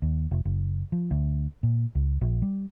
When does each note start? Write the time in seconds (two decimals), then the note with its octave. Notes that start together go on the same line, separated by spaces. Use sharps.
0.02 D#2
0.31 F1
0.45 F#1
0.92 F3
1.11 D2
1.63 A#2
1.95 C#2
2.21 A#1
2.42 G3